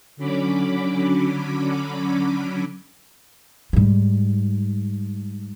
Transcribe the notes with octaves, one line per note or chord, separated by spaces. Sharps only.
D3 F#3 C#4 B5 D6
G#2 G3